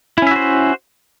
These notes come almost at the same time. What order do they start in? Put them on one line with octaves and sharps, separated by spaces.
E4 C#4 E5 F#4 C5